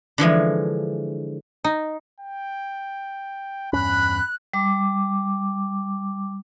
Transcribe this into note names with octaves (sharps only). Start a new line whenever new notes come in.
D3 E3 F3 G#3
D#4
G5
E2 G2 C#4 B5 F#6
G3 D6